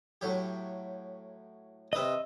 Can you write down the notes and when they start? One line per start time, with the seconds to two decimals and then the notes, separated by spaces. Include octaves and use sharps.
0.21 A2 F#3 G4
1.93 C3 B4 D#5 D#6 E6